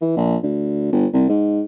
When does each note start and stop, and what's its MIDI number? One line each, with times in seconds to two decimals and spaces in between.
0.01 0.14 52
0.17 0.37 34
0.43 0.90 38
0.92 1.06 31
1.13 1.25 36
1.29 1.63 44